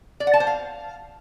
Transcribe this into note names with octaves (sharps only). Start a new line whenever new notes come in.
D5
F#5
A5
C5
F5